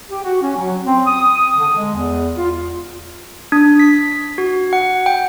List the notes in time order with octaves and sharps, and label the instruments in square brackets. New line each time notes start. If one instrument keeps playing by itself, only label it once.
[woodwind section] G4
F#4
C#4
F#3
C4
D#6
D3
G#3
E2
F4
[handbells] D4
B6
F#4
F#5
G5